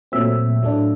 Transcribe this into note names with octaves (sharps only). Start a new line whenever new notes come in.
A#2 F#3 A3 C4 E5
A2 F#3 A3 D4